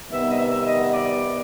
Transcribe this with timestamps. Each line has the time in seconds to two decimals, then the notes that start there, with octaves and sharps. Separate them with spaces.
0.10 C3 D#3 G3 B3 E5
0.31 D#5
0.38 E5
0.66 D#5
0.94 D5